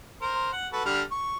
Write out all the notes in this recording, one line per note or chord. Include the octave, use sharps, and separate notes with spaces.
A#4 C5
F#5
F#4 A4 B4
D3 G3 F6
C#6